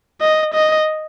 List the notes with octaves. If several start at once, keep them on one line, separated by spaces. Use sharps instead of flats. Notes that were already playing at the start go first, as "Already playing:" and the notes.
D#5
D#5